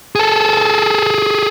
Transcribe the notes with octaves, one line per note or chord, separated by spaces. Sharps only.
G#4 A4